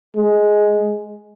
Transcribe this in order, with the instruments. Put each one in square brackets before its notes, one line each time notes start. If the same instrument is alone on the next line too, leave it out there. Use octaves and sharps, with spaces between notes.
[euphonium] G#3